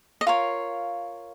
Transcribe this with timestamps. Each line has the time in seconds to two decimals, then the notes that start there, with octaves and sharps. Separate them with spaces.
0.21 D#5
0.26 F4 A#4 C#5 F5